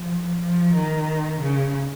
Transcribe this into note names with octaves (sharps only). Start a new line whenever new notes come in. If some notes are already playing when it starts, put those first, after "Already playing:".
Already playing: F3
F3
D#3
C#3